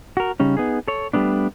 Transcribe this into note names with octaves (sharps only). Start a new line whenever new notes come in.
F#4 A#4
C#3 G3 C#4 D#4
B3 D#4 G#4
A4 C#5
G3 A3 B3 D4